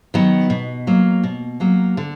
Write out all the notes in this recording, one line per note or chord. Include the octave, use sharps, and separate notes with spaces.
D#3 F#3 B3
B2
F#3 A#3
B2
F#3 A#3
D3